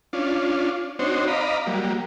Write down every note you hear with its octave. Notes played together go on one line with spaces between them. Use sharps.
C#4 D4 F4
C4 D4 D#4 F#4 C5 C#5
D5 D#5 F5 A#5 B5
F#3 G3 A#3